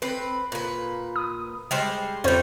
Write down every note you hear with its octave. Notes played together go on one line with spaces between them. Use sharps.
C4 B4
A#2 B4
D#6
G3 G#3 C5
F2 G3 C#4 C5 G6